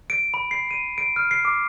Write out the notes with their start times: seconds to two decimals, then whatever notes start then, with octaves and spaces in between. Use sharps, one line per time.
0.10 D7
0.34 B5
0.51 C7
0.71 D#7
0.98 D7
1.16 F6
1.31 C7
1.45 D6